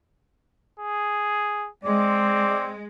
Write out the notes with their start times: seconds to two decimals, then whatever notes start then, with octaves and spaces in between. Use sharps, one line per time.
0.79 G#4
1.84 G#3 C4 D5